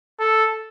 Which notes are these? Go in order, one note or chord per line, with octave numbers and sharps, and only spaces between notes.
A4